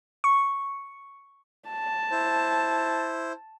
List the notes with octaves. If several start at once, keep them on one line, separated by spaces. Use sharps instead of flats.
C#6
A5
E4 C5